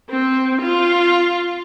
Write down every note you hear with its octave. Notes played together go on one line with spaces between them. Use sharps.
C4
F4